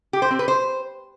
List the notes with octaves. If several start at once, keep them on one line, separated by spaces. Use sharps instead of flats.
G4
C5
C4
B4
C5